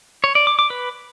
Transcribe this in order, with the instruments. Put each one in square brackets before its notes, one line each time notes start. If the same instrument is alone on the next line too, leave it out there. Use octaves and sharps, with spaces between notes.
[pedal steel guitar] C#5
D5
D6
D6
B4